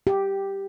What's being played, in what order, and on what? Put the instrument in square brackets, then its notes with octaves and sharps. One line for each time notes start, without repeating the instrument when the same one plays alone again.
[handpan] G4